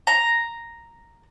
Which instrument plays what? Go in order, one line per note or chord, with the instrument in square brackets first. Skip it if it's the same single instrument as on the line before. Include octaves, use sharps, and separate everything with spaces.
[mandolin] A#5